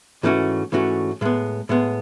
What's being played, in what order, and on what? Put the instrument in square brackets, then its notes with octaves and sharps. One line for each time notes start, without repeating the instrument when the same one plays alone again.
[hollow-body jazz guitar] G#2 E3 A3 C#4 F#4
G#2 E3 A3 C#4 F#4
A2 G#3 B3
A2 G#3 B3